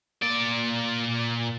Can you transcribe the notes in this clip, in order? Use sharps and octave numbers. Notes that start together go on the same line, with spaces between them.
A#2 D5